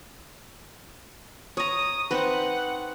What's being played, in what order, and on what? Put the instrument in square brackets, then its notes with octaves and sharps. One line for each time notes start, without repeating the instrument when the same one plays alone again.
[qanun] C#5 A#5 [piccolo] D#6
[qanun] C4 D#4 B4 [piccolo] F#5